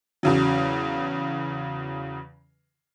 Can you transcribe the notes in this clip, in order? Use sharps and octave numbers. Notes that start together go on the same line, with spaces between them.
E2 C#3 F#3